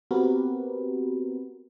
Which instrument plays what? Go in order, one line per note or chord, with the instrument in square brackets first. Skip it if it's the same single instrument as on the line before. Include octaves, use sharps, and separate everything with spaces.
[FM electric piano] B3 C4 F#4 G4 A#4 B4